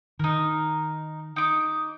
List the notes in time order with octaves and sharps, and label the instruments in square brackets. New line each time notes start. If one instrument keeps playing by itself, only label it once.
[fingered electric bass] D#3 [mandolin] D#4 A#4
[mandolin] D#4 D6